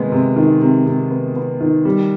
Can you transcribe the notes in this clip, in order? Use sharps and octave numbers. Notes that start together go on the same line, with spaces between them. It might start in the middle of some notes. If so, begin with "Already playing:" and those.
Already playing: C3 D#3 G#3 B3
C3
D#3
C3
C3
B3
B3
D#3
G3